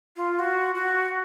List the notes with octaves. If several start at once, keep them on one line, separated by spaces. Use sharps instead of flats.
F4
F#4
F#4